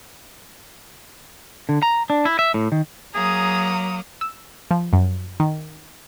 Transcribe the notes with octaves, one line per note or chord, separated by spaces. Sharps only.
D3
A#5
D4
E4
E5
A2
D#3
F#3 A#3 G#4 A#5 D#6
E6
F3
F#2
D#3